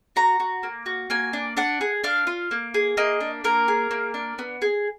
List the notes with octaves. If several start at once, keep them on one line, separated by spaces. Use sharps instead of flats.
F#4 A#5
F#4
A#3
F#4
A#3 G#5
D4
D4 F#5
G#4
D4 F5
F4
A#3
G#4
A#3 D#5
D4
A#3 A#4
G#4
A#3
D4
B3
G#4